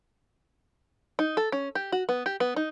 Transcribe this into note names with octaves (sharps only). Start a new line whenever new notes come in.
D#4
A4
C#4
G4
F#4
B3
G4
B3
D#4